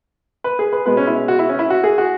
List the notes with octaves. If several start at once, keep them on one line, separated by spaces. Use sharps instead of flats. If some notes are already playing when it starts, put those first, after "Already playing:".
B4
G#4
B4
B2 G#3 B3 B4
C#4
E4
F#4
E4
C#4
E4
F#4
G#4
F#4